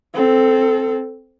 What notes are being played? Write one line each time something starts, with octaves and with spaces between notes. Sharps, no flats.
C4 A4